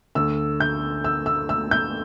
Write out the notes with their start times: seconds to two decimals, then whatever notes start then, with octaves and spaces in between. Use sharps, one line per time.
0.15 D2 D3 E6
0.60 G6
1.04 E6
1.26 E6
1.49 E6
1.71 G6